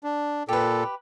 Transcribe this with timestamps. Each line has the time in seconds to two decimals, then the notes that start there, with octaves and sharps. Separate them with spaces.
0.04 D4
0.49 A#2 G4 A4 B4